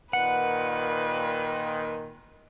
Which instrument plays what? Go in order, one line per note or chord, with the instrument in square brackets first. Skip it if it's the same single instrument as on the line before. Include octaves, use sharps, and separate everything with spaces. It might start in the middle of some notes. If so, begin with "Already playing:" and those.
[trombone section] A#2 D#3 [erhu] B4 [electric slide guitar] F#5